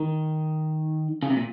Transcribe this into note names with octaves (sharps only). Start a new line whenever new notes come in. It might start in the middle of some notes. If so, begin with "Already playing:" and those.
Already playing: D#3
C#3
C3
A#2